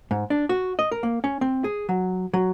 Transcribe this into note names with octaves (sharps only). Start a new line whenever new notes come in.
G#2
D4
F#4
D#5
A#4
A#3
C#4
C4
G#4
F#3
F#3